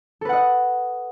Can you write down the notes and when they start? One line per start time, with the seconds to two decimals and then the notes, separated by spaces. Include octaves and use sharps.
0.21 A4
0.25 B4
0.29 F#5
0.33 D#5